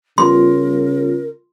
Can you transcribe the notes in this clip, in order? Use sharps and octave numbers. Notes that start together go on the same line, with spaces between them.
C#3 G3 B3 F4 A#4 C6